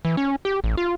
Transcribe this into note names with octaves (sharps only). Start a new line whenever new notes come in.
E3
C#4
G4
A1
F4